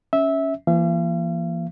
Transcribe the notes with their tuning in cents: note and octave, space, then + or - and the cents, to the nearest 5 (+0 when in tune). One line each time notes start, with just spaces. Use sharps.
C#4 +5 E5 -15
E3 +45 A#3 +15 F5 -45